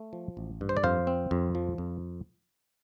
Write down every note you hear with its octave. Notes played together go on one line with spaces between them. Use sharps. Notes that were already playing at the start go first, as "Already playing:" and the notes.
Already playing: A3
F3
A1
G2
C5
D5
F2 C5 F5
C4
F2
F3
F2